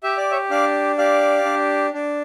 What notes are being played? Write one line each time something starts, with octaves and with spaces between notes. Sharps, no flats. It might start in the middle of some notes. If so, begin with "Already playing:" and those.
G4 E5
D5
C#5 E5
D4 D5 F5
G4 D5 F5
D4
D4